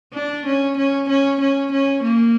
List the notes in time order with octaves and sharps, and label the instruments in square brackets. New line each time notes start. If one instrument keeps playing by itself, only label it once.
[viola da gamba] D4
C#4
C#4
C#4
C#4
C#4
A#3